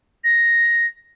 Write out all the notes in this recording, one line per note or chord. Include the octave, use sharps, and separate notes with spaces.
A#6